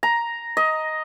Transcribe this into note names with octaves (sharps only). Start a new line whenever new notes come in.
A#5
D#5